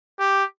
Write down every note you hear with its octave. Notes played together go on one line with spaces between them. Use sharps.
G4